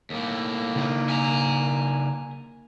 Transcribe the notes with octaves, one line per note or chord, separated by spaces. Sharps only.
D#2 A2 A#3
C#3 D#4 A#4
G#5 A#5